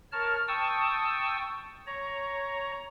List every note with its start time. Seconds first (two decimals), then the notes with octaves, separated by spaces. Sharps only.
0.12 A#4 C#5 A5 F6
0.48 G5 A5 C#6 D#6 E6
1.87 C#5 A#5